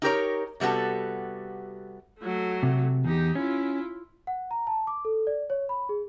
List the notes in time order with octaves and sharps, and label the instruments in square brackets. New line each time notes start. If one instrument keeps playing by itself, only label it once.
[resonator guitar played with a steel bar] D#4 G4 A#4 C#5
C3 G3 B3 F#4 A4
[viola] F#3 A3
[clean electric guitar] C3
[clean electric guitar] E2 [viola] D#4 G4
[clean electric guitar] C#4 [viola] E4 F4
[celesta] F#5
A#5
A5
D6
A4
D5
C#5
B5
G#4